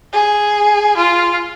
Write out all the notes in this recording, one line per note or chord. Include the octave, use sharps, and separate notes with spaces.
G#4
F4